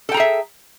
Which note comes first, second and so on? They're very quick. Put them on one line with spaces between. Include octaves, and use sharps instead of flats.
A4 G5 A#5 G#4 E5